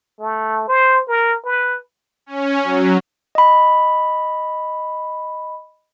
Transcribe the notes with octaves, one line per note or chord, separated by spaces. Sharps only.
A3
C5
A#4
B4
C#4
F#3
D#5 B5